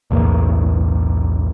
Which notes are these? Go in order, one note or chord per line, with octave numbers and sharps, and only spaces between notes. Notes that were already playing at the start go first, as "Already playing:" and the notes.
B1 E2 A2 A#3